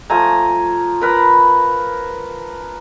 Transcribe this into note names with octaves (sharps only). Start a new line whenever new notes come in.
F3 A3 G#5 A#5
A#4 B4 B5